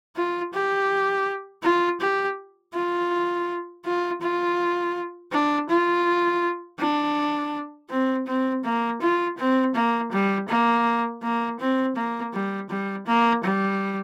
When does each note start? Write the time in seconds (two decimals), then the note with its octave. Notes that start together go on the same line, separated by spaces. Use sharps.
0.16 F4
0.53 G4
1.63 F4
2.00 G4
2.74 F4
3.85 F4
4.22 F4
5.32 D4
5.69 F4
6.79 D4
7.90 C4
8.27 C4
8.64 A#3
9.01 F4
9.38 C4
9.75 A#3
10.12 G3
10.48 A#3
11.23 A#3
11.59 C4
11.95 A#3
12.33 G3
12.69 G3
13.06 A#3
13.44 G3